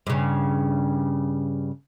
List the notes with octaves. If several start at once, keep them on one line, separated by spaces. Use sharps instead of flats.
G2 C#3